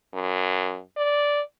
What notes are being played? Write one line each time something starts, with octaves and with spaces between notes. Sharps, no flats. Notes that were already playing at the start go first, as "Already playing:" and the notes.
F#2
D5